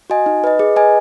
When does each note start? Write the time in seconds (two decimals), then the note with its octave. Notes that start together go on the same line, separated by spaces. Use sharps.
0.10 F#4 D#5 G#5
0.26 D#4
0.44 B4 D#5
0.59 G#4
0.76 B4 D#5 G#5